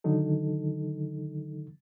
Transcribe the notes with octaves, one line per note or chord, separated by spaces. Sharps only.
D3 D#3 F#3 D#4 A4